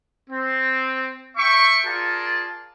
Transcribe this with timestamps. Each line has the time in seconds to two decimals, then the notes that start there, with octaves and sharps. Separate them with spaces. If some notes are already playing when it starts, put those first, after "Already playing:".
0.30 C4
1.37 E5 G5 C#6
1.85 F4 G#4 A#4 D5 A5